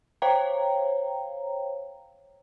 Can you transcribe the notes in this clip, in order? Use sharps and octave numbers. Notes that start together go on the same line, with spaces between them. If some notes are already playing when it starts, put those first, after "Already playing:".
C5 C#5 F5 G5 A#5